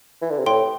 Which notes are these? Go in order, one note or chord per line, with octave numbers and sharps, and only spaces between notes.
E3
D3
C3
A2 G5 C6